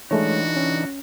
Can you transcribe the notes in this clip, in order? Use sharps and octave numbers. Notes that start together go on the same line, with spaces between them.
E3 G#3 A3 D4 D#4 F#4 C#5
C#4